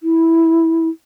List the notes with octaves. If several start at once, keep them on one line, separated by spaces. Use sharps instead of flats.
E4